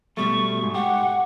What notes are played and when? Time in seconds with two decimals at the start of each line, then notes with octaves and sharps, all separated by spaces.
0.17 B2 G3 A3 C#6
0.63 G#2
0.75 G4 F#5